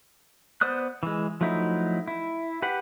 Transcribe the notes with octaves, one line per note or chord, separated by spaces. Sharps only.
B3 C5 D5 D#6 F#6
E3 G#3
F3 F#3 A3 D#4 E4
E4
G4 B4 F#5